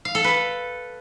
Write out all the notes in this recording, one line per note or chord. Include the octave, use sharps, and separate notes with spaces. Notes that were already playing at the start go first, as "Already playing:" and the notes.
F5
A4
B4